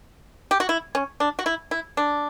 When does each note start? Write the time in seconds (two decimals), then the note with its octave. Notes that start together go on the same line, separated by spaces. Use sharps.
0.51 G4
0.60 F#4
0.69 E4
0.95 C#4
1.20 D4
1.39 F#4
1.46 E4
1.71 E4
1.97 D4